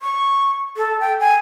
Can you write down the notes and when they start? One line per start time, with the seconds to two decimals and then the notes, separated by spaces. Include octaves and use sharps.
0.02 C#6
0.77 A4
1.00 G5
1.20 G#5